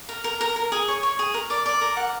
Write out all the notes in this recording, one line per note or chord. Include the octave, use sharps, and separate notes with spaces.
A#4
A#4
A#4
A#4
G#4
C#5
C#5
G#4
A#4
D5
D5
A#4
F#5